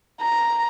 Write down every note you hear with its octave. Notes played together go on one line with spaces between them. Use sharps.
A#5